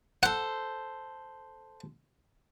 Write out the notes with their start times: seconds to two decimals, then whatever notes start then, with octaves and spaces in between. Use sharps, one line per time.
0.23 A4 C5 F#5